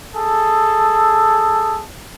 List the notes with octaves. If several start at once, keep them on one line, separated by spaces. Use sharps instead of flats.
G#4 A4